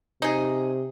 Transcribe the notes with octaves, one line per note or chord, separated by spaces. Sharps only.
C3 D#4 G#4